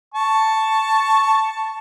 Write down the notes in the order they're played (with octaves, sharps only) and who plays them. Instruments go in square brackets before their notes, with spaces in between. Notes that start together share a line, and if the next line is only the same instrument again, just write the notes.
[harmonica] A5 C#6